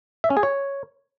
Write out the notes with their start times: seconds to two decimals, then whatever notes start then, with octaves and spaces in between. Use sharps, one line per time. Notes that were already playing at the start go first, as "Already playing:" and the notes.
0.24 E5
0.30 C#4
0.37 G#4
0.43 C#5